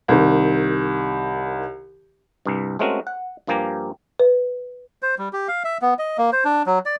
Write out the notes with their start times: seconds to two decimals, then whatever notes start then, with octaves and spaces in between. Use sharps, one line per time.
0.08 C2 D#3
2.46 C2 G2
2.79 G#3 A3 C4 C#4 F#4 A#4
3.07 F#5
3.47 G2 F3 A#3 G4 G#5 A#5
4.19 B4
5.02 C5
5.18 G3
5.33 G4
5.48 F5
5.64 E5
5.82 B3
5.99 D#5
6.18 A#3
6.32 C5
6.45 D4
6.66 F#3
6.86 D5